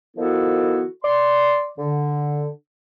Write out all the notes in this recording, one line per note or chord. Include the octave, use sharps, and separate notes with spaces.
D#3 F3 B3 E4 F#4 A4
D5 C6
D3